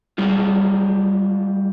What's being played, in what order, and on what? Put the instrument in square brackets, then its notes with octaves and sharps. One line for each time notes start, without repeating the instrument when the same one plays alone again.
[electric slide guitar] G3 G#3 F4